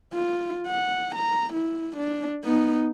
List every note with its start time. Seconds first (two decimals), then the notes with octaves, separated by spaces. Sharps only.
0.13 F4
0.67 F#5
1.15 A#5
1.53 E4
1.97 D4
2.44 B3 D#4